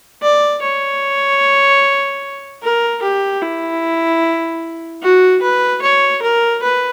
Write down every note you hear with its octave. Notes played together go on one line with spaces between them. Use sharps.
D5
C#5
A#4
G4
E4
F#4
B4
C#5
A#4
B4